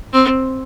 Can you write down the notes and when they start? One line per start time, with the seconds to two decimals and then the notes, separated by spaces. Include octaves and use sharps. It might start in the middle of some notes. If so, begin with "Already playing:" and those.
0.13 C4